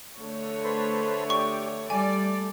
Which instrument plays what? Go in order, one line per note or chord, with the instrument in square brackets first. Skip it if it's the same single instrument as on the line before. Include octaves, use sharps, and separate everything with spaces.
[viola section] D3 A3 C#5
[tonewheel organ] A4 B4 C5
[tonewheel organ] G4 D5 [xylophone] C#6
[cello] G3 [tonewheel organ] A3 [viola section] D5 [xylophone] G#5